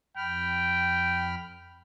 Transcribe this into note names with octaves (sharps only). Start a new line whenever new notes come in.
F2 G5 B5 F6